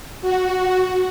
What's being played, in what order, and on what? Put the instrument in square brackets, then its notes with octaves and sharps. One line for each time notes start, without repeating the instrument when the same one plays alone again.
[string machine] F#4